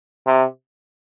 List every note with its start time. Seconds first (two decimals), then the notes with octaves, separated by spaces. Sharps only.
0.27 C3